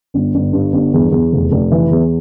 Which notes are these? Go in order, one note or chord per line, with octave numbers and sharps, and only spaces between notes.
G1
G1
G2
G1
E2
E2
F1
F1
E3
E2